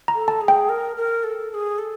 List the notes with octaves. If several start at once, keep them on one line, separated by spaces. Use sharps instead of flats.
A#5
A4
A5
G#4
G5
A#4
A#4
A4
A4
G#4
A4